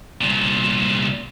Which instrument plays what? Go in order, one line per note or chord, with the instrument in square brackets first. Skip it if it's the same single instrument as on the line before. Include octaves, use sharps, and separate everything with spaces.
[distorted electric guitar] C2 A#2